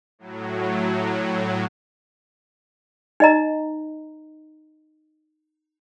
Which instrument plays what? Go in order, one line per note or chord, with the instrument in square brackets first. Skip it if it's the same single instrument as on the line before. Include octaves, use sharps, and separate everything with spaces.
[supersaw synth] A2 F#3
[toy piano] D#4 D#5 A#5